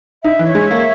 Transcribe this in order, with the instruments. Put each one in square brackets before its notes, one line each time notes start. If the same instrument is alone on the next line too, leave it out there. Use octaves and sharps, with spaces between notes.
[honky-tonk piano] D#4 [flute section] E5
[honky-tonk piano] E3
[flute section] C#5
[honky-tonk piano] G#3
[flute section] E5
[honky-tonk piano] A#3